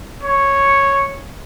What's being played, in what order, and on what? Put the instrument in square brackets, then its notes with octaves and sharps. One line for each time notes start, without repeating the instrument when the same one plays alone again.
[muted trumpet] C#5